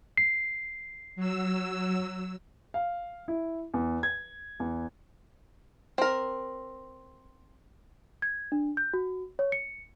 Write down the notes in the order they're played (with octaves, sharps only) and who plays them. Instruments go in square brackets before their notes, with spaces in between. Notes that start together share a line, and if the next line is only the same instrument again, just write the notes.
[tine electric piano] C7
[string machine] F#3 E6
[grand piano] F5
E4
E2
G#6
E2
[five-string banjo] C4 A#4
[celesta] G#6
D4
G6
F#4
C#5
C#7